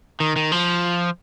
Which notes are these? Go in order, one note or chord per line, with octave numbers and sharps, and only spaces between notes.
D#3
D#3
F3